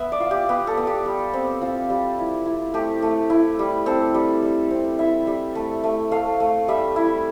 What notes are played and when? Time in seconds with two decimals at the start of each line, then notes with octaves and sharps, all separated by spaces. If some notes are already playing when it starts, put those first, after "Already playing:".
Already playing: B3 E5
0.12 D5
0.20 F4
0.31 G4
0.49 B3 G4
0.67 A4
0.77 B3
0.87 G4
1.06 G3
1.33 C4
1.62 C4 F4
1.90 G3
2.18 E4
2.45 E4
2.74 A3 G4
3.02 A3
3.30 E4
3.59 G3
3.86 C4 A4
4.14 G3
4.42 G3
4.71 C4
4.99 E4 E5
5.27 G3
5.55 A3
5.84 A3
6.11 A3 F5
6.40 A3
6.68 G3 E5
6.96 E4